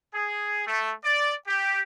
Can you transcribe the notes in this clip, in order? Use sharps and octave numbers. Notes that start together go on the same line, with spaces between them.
G#4
A3
D5
G4